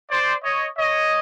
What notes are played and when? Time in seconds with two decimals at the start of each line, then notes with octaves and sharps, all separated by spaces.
0.10 C5 D5
0.44 C#5 D#5
0.78 C#5 D#5